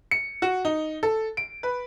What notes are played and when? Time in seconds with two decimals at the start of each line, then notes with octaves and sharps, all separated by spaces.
0.11 C#7
0.42 F#4
0.65 D#4
1.03 A4
1.37 D7
1.63 B4